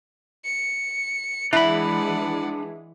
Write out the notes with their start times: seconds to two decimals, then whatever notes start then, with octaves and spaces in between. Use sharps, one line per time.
0.45 C#7
1.53 E3 G#3 D4 E4 D5 F#5 B5